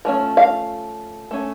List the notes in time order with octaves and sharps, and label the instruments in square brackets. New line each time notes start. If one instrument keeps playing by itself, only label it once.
[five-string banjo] F3 A3 C#4
F5
A3 C#4